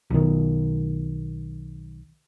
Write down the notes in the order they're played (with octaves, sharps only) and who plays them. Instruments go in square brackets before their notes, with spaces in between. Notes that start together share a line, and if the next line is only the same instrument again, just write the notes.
[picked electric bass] B1 D#3